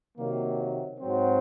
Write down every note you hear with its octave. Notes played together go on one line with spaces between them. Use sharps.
C3 D#3 F#3 A#3
G#2 F#3 C4